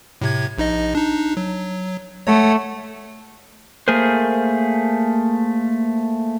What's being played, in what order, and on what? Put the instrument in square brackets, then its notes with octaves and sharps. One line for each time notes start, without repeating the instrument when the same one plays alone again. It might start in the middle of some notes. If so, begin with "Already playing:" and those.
[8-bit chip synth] A2 C3 G#6
A#1 D#4 D#5
D4 D#4
F#3
[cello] A3 [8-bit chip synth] C#5 F#5
[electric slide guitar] A3 A#3 G#4 A#4 C5